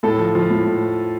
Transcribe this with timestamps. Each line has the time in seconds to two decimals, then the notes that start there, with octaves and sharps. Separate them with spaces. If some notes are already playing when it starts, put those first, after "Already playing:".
0.03 A2 A4
0.18 F3
0.35 F3
0.50 A2
0.66 A2